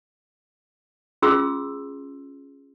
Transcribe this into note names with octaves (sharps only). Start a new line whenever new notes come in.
C#4 F4 G#4 C6 E6